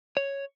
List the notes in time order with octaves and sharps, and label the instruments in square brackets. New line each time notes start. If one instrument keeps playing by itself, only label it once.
[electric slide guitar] C#5